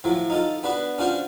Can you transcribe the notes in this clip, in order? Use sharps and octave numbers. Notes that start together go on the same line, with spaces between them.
A2 F3 F#3
D#4 F4 A4
B3 D4 F#4 B4
C#4 D4 F4 F#4 C5